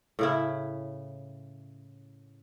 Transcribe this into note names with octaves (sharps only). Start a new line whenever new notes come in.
A2 C#3 E4